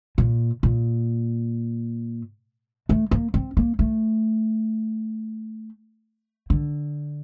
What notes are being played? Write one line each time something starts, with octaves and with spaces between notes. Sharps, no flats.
A#2
A#2
A3
A#3
C4
A#3
A3
D3